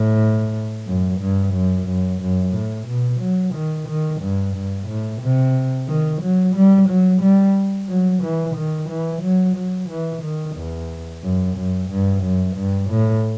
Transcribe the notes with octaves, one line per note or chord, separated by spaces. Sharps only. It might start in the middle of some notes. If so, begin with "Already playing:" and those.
Already playing: A2
F#2
G2
F#2
F#2
F#2
A2
B2
F#3
D#3
D#3
G2
G2
A2
C3
D#3
F#3
G3
F#3
G3
F#3
E3
D#3
E3
F#3
F#3
E3
D#3
E2
F#2
F#2
G2
F#2
G2
A2